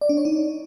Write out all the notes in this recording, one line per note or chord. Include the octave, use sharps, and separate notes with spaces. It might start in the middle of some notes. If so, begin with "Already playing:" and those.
D5
D4
C#5
D#4